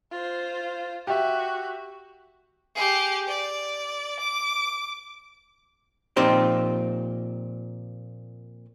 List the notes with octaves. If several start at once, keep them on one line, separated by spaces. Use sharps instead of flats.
F4 C5
F#4 G4 E5
G4 G#4
D5
D6
A#2 F3 C4 D#4 G4